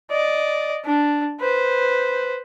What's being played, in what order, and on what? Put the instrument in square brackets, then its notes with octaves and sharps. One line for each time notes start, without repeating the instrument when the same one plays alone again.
[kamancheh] D5 D#5
D4
B4 C5